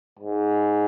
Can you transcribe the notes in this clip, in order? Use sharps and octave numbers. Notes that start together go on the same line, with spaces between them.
G#2